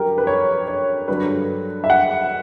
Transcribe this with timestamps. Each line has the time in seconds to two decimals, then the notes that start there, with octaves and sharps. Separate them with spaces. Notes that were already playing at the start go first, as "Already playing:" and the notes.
Already playing: G2 D3 F#3 G4 A#4
0.18 B4
0.27 C#5
0.68 C#5
1.08 G2 D3 F#3 B4
1.84 E5
1.90 F#5